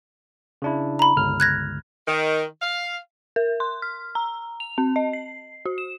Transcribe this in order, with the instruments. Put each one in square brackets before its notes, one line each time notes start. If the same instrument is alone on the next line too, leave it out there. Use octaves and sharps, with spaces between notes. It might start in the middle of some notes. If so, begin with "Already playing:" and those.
[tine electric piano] C#3 D4 E4
[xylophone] A#5 B5
[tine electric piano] G1 C#2 F6
[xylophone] F#6 G#6 A#6
[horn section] D#3
F5
[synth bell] A#4
C6
F6
A#5
F7
C4
D#5
C7
F#4
E7